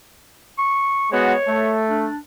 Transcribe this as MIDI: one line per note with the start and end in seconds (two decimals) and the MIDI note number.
0.58 1.12 85
1.12 1.35 56
1.12 1.35 59
1.12 1.35 66
1.12 1.80 73
1.47 2.08 57
1.90 2.17 62